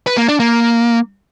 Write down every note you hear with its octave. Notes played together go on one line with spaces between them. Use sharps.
B4
A#3
D4
A#3